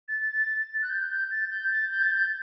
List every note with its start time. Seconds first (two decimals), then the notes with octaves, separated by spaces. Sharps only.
0.08 A6
0.82 F#6
0.90 G6
1.09 G6
1.31 A6
1.50 G6
1.71 A6
1.91 G6
2.03 A6
2.11 G6